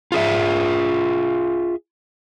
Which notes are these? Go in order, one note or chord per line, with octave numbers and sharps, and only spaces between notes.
F4 G#4 E5